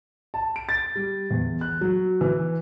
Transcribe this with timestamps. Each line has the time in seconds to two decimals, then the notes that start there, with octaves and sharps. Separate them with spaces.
0.34 A5
0.56 D7
0.69 A6
0.95 G3
1.31 E2
1.61 F#6
1.81 F#3
2.21 E3